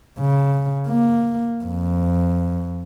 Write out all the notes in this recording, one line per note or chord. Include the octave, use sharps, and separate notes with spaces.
C#3
A#3
F2